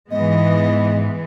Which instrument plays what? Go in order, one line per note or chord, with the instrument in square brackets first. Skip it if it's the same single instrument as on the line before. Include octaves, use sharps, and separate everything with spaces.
[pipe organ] G#2 [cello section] E3 G#3 B3 [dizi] D#5